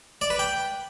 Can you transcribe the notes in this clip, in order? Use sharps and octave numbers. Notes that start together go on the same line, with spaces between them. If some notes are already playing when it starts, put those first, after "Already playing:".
D5
B4
G5